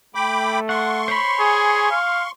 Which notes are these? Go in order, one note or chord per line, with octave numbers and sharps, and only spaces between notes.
A3 G5 B5 D6
F#5 C6 C#6
C5 C#5 B5
G#4 G#5
F5